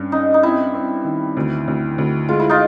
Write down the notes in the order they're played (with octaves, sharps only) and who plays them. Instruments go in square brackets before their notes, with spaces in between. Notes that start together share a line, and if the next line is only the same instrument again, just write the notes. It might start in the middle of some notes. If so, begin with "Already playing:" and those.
Already playing: [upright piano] G2 C#4
[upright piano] C#4 [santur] D#4
[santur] D#4
[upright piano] C4 [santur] E4
[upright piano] C4
D#3
D2
D2
D2
[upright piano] G#3 [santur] F4
[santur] E4
D#4 F4